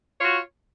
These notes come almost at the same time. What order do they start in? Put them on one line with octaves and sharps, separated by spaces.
C#5 F4 F#4